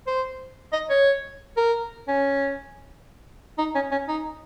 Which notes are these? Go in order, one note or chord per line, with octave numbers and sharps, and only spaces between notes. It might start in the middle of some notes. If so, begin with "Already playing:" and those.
C5
D#5
C#5
A#4
C#4
D#4
C#4
C#4
D#4